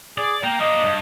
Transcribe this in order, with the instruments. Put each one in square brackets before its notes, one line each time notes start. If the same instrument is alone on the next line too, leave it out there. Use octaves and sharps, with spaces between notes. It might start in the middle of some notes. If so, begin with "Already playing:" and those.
[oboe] G#4 [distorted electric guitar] D5
[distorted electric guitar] A#3 A#4 [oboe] G5
[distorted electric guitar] A#3 D4 [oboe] D#5
[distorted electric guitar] G2